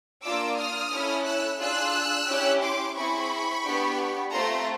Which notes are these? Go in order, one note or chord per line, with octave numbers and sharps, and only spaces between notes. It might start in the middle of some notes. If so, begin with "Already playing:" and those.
A#3 D4 F4 D6 E6
D#6 F6
C#4 E4 A4
E6 F#6
D4 F4 G#4 E6 F#6
C#4 E4 G4
C6 D6
C4 E4 G#4 B5 C#6
B3 D4 G4
A3 C4 F4 A4 A#5 C6